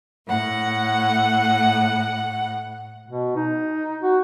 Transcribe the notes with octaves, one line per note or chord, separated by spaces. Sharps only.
A2 F#5
B2
D#4
F#4